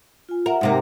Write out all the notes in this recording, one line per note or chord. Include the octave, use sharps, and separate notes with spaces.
F4 G#5
A#4 E5 F#5
G#2 C3 A#3